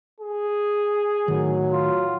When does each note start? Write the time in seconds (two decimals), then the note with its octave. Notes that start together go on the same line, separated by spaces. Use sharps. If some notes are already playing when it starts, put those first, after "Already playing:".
0.20 G#4
1.28 A2 D#3 F#3
1.72 F4